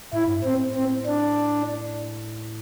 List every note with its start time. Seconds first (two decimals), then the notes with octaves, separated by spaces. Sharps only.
0.13 A2 E4
0.27 G2
0.40 A2 C4
0.75 C4
1.06 D4